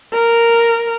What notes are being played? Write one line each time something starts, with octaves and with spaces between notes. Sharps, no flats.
A#4